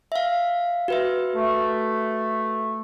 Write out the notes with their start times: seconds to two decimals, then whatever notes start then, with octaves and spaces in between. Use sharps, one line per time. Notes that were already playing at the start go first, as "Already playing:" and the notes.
0.12 E5 F5
0.88 F#4 B4 E5
1.35 A3